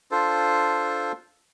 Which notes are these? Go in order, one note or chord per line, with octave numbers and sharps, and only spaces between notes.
D4 F4 A4 C5